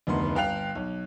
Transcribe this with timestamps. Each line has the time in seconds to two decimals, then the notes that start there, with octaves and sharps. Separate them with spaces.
0.07 F1 D2 D#3 B3 C6
0.35 G1 F5 G5 F#6 F7
0.75 B1